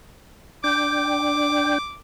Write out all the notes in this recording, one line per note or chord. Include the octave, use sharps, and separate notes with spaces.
D4 G5 D6